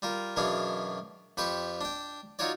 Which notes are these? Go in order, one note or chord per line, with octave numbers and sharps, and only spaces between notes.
G3 F4 A#4
F#2 B2 E3 D4 G#4 F5
F2 G4 B4 C5 C#6
D4 G5
D#4 F4 F#4 C#5 D5